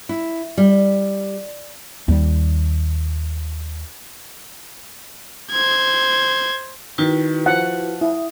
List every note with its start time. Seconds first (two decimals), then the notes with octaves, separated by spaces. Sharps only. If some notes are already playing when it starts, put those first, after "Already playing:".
0.09 E4
0.58 G3
2.08 D#2 G3
5.52 C5 G#6
6.98 D#3 E4 F#4 B4
7.46 F3 F#5
8.01 E4 D#6